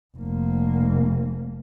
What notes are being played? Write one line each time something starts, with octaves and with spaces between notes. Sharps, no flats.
F1 A#3